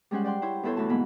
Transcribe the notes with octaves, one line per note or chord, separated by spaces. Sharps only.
G3 G#3 C#4 C5 F#5
D5 F#5 G5 C6
E4 C5 C#5
E2 E3 E4 A4 C5 C#5
D2 E3 A3 F#4 A5
G#2 B2 G#3 A#3 B3 B5